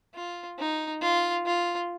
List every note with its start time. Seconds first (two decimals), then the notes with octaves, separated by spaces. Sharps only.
0.15 F4
0.59 D#4
1.02 F4
1.46 F4